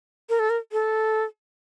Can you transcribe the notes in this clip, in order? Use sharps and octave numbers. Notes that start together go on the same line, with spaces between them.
A#4
A4
A#4
A4